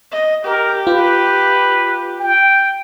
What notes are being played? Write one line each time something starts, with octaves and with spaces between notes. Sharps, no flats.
D#5
G4 A#4
F4 B4
G5